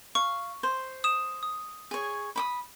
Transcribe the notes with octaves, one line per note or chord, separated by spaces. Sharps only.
F5 C#6
C5
D#6 E7
D#6
G#4 C#5
B5 D6 D#6